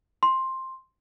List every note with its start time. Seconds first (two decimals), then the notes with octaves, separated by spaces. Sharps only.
0.23 C6